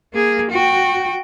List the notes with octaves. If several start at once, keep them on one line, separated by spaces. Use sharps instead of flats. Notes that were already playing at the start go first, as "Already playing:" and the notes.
A#3 G#4
F#4 G5